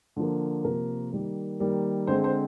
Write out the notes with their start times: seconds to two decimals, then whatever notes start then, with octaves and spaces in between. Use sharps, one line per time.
0.16 D3 F3 A#3
0.64 C3 F3 A#3 A#4
1.12 D#3 G3 A#3
1.60 D#3 G3 A#3
2.07 D3 G#3 C4 C5
2.24 C5